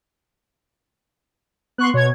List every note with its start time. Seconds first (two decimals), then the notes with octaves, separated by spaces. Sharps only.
1.78 B3 C6 C#6 F#6
1.94 B2 C#5 G#6